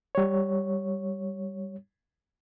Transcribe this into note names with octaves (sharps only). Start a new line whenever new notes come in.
G3 C#5